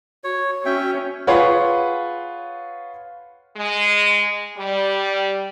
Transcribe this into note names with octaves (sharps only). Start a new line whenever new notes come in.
F#4 C#5
C#4 E5 G5
F4 G#4 B4 C#5 F#5 C6
G#3
G3